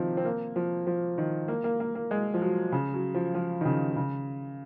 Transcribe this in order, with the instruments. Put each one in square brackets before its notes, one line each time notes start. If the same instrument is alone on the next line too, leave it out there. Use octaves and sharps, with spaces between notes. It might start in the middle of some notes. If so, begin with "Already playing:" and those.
Already playing: [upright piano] C3 D#3 F3
C4
A#3
F3
F3
D#3
A#3
A#3
A#3
A#3
G#3
F3
F#3
C#3
F#3
F3
F3
D#3
C#3
C#3